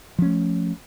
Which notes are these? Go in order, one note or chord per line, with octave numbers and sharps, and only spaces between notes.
F3 A3 C#4